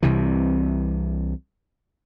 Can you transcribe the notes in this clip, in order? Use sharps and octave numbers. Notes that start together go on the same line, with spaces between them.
C2 C3 E3